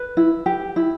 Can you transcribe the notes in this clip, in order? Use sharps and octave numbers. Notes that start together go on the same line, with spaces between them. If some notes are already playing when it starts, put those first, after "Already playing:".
Already playing: B4
E4
G4
E4